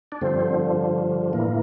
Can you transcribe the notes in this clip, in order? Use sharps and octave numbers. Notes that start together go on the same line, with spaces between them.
D4
G2 D3 F3 C4
A2 E3 A#3